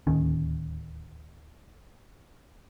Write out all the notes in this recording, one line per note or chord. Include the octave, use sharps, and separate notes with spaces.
D1 D#2 D#3 C#4